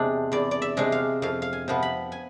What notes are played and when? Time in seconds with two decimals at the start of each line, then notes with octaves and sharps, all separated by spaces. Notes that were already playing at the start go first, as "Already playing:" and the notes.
Already playing: E2 C3 G#3 D4 D5
0.32 E2 D5
0.51 D5
0.62 E5
0.77 C3 G#3 D4
0.92 F5
1.22 F2 F5
1.42 F5
1.53 G#5
1.68 C3 F3 B3
1.83 B5
2.12 G#5